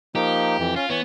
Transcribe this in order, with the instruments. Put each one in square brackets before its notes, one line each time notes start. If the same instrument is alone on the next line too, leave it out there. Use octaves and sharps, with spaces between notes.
[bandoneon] F3 A#3 D#4 [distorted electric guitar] G4
[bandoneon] F2 E3
[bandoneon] C#4 [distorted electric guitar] F4
[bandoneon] E3 C#5 [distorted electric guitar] B3